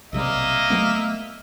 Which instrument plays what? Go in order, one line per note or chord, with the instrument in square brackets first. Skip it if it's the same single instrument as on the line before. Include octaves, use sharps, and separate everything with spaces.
[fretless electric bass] B1 C3 G3 [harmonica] A#3 D#5 E5
[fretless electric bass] F#3 A3 B3